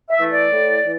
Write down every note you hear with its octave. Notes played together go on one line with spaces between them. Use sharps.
E5
E3 A3
D5
A2
E3